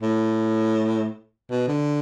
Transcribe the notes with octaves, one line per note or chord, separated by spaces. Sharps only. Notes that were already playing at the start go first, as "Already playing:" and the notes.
A2
B2
D3